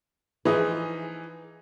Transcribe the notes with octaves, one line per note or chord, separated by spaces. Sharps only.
E3 F3 D#4 G#4 B4